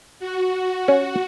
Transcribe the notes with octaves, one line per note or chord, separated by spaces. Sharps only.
F#4
C#4